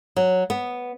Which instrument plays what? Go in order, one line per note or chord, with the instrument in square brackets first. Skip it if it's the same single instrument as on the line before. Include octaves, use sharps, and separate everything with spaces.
[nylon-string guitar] F#3
B3